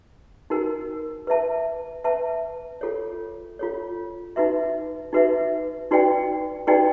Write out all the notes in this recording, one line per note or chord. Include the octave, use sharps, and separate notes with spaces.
D#4 F#4 A#4
B4 E5 A5
B4 E5 A5
F4 A4 C#5
F4 A4 C#5
D#4 F#4 B4 E5
D#4 F#4 B4 E5
D#4 F#4 B4 D5 G5
D#4 F#4 B4 D5 G5